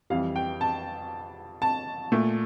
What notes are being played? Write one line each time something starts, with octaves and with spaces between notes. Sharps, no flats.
F2 E3 G3 F5
G5
A5
A5
A#2 A3